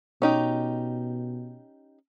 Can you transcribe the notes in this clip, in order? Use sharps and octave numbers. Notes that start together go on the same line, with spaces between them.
B2 C#4 D#4 G4